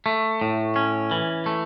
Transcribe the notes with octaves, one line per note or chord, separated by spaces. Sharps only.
A3
A2
C#4
E3
A3